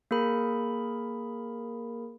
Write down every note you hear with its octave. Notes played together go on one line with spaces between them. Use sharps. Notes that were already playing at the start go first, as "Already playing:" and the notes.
A#3 G#4 A#4 B5